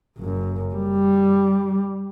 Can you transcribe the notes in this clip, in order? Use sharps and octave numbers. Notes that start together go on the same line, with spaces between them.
F#1 F#2
G3